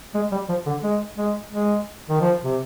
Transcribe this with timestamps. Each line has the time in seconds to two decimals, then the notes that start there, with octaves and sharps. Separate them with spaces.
0.14 G#3
0.32 G3
0.49 F3
0.66 D3
0.83 G#3
1.18 G#3
1.52 G#3
2.09 D#3
2.21 F3
2.44 C3